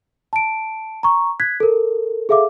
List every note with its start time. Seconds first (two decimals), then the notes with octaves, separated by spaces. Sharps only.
0.33 A5 D7
1.03 A#5 C#6
1.40 F#6 G#6 B6
1.60 A4 A#4
2.29 G#4 A4 E5 F5 D6